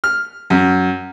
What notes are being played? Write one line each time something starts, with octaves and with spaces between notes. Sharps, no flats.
F6
F#2